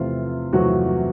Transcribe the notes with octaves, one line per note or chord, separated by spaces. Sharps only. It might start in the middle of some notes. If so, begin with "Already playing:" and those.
Already playing: E2 C3 F3 A3 F4
E2 C3 F3 F#3 A3 F#4